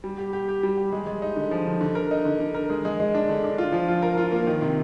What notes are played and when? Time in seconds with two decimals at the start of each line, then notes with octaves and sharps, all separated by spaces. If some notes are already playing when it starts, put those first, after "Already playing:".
0.04 G3
0.18 G4
0.33 G4
0.49 G4
0.63 G3
0.77 G4
0.92 G#3
1.07 G#3
1.22 D#4
1.36 D3
1.51 F3
1.67 D3
1.81 D3
1.95 A#4
2.11 D#4
2.25 D3
2.40 D3
2.54 A#4
2.70 G#3
2.85 G#3
3.00 G#3
3.15 D4
3.29 D3
3.44 D4
3.58 F4
3.73 F3
3.88 F4
4.02 A#4
4.18 F4
4.32 A#3
4.47 D#3
4.62 C3